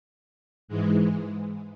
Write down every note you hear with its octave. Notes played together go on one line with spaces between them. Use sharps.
G#2 E3 G#3